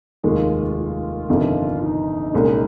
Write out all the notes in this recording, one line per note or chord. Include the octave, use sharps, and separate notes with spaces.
F1 D#2 D#3 G#3 F4
F4
G1 F2 C3 D#3
D#4
C2 A#2 G#3 C#4